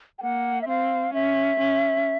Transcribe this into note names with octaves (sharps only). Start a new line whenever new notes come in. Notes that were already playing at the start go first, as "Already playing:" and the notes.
G5
A#3 F#5
E5
C4 F5
C#4 E5
C#4